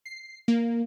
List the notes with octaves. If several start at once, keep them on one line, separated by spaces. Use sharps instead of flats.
C7
A#3